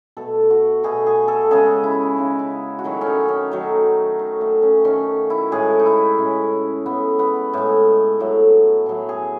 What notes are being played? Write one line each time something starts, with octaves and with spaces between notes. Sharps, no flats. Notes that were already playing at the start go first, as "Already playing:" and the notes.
B2 A3 A4
F#4
B2 A3 G#4
G#4
A4
C#3 G#3 G#4
E4
C#3 G#3 D#4
E4
F#4
D#3 F#3 A3 E4
C#4
D#4
C#4
D#3 F#3 A3
D#3 A3
A3
C#4
D#3 A3 C#4
E4
A2 G#3 G#4
D#4
E4
A2 G#3 C#4
A2 G#3 B3
B3
A2 G#3
A2 F#3 A3
A2 F#3 A3 G#4
G#4